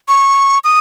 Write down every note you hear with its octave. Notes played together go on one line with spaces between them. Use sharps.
C#6
D#6